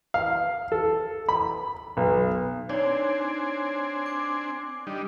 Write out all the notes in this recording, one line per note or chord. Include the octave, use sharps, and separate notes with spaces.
F5
A4
B5
B1
C4 D4 D#4 C#5 D5 G#5
D6
G3 D4 D#4